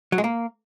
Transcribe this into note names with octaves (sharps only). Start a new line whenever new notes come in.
F#3
G#3
A#3